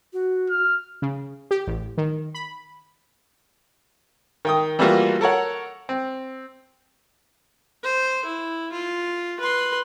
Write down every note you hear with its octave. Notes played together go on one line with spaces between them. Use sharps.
F#4
F6
C#3
G4
A1
D#3
B5
D#3 G5 D#6
E3 G3 A3 A#3 F4 F#4
A4 A#4 C#5 F#5
C4
C5
E4
F4
B4 C6